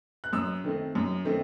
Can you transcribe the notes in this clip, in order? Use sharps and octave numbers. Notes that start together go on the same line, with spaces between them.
F#6
F#2 E6
D#3 A3 C4
F#2
D#3 A3 C4